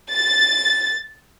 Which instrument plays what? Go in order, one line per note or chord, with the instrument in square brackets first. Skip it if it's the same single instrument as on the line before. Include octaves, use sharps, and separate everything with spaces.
[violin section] A6